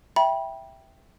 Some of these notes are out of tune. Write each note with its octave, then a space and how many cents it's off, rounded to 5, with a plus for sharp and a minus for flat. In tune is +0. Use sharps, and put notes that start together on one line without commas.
E5 +0 G5 +0 B5 -35